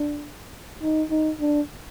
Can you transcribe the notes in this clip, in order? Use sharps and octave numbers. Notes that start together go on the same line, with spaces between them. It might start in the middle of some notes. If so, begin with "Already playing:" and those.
Already playing: D4
D#4
D#4
D4